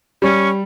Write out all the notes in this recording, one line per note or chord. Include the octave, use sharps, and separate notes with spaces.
G3 C#4